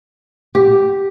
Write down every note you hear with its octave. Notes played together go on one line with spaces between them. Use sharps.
G4